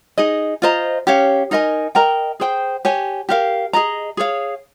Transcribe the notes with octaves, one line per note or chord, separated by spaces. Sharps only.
D#4 G#4 D#5
F4 C5 D#5 A#5
C#4 G4 C#5 F5
D#4 A#4 D#5 G#5
A#4 D#5 G5 A#5
G#4 C5 G5
G4 C#5 G#5
G4 A#4 F5
G#4 D#5 A#5
G#4 C#5 F5